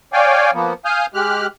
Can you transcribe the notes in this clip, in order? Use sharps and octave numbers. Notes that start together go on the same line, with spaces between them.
C#5 D5 F5 G5 G#5
F3 A#3 B3
F5 G#5 D#6 F6 G6
G#3 G4 F6 F#6